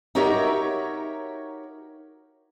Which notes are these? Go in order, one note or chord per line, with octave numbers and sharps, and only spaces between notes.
D#4 F#4 G4 A#4 C#5 E5